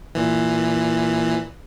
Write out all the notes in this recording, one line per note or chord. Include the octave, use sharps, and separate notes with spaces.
A#2 E3